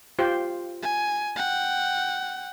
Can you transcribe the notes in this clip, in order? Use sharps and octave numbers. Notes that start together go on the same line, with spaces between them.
F4 G4 C5
G#5
F#5 G5